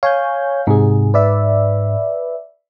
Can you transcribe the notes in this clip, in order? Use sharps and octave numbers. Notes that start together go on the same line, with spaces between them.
C#5 F5 G#5 G6
G#2 C3 G#4
B4 D5 E5